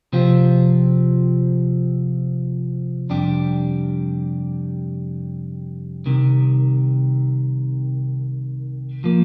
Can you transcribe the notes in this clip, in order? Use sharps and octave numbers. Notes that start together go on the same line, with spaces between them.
C3 F3 C4 F4
F2 C3 G3 D4 G4
C2 C3 D#3
F3 A#3